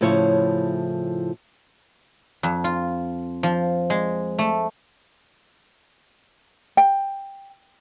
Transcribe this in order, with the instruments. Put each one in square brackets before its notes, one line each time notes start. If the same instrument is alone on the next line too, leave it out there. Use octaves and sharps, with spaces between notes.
[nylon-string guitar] A2 C#3 F3 E4 C#5
[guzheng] F2
F4
F3
G#3
A3
[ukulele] G5